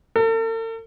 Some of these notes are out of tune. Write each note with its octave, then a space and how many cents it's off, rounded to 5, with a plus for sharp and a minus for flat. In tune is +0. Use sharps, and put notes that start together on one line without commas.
A4 +45